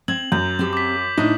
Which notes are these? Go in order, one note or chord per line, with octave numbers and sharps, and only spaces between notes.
C4 G#6 F#7
F#2 A#5 G6
C4 G4
D6 B6
A2 D4 D#4